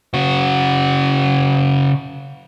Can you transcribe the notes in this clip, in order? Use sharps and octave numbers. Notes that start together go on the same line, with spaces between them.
C#3 F#4